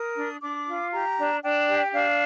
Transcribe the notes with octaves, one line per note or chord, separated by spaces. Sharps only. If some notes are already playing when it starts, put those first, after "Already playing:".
Already playing: A#4 D#6
D4
D4 D6
F4
G4 A#5
D4
D4 G5
G4
D4 F5